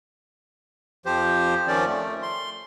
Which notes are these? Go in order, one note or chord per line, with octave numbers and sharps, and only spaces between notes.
F2 F3 G4 C5
D#3 F3 C#4 D5
A3
C6